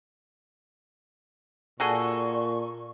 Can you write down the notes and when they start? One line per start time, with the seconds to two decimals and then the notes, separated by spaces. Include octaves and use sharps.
1.80 A#2 F#4 G#4 A4 D5 C#6